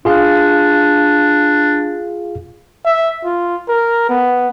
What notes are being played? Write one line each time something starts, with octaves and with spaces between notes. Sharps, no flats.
D4 F4 G#4 F5
E5
F4
A#4
B3